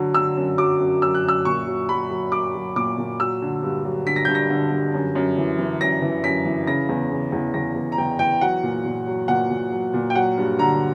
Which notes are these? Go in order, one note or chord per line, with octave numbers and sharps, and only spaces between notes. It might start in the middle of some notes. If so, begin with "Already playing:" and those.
Already playing: D3 F#3
D3 E6
F#2
F#3 D6
F#2
F#2 E6
F#6
F#2 E6
A#2 C#6
F#3
F#3 B5
F#3
F#3 D6
F#3
A#2 D6
A#2
F#3 E6
D3
G2
F#3
D3 B6
A#6
G2 G6
A#6
D3
G2
F#2
F#2
E3
E3
F#2 A#6
E3
F#2 B6
E3
C#3 A#6
E2
C#3
E2
E2 A#6
E2
A#5
E2 G5
E2 G5
F#3 F#5
A#2
A#2
F#3
A#2 F#5
A#2
F#3
A#2
G5
F#3 F#5
G2
D3 A#5